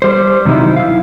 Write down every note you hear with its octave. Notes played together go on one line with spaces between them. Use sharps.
G3 C5
F#2 C3 D#3 F#3 D#4 E4
E4 F5